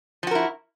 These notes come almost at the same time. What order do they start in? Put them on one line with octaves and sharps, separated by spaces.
F3 F#4 A#4 E4